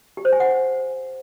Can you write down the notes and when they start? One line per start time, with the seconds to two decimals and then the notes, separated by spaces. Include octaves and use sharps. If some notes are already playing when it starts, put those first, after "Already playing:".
0.17 G4
0.25 C5
0.33 G#5
0.40 F#5